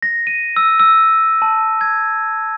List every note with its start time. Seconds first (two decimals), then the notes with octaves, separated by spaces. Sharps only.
0.02 A#6
0.27 D#7
0.56 E6
0.80 E6
1.42 A5
1.81 G#6